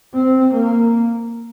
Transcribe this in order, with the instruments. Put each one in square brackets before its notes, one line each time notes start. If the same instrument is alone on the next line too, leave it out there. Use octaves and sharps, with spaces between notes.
[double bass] C4
A#3